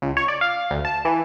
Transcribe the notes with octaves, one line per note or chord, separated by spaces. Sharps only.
C#2
C#5
D5
F5
D2
A5
E3